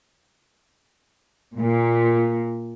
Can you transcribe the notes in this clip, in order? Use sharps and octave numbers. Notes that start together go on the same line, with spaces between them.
A#2